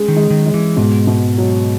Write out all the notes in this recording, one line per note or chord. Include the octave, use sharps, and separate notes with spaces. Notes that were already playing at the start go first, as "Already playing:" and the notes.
Already playing: G#3 C#4 G#4
D#3
G#3
D#3
G#3
E3
G#2 B2
B2
F#3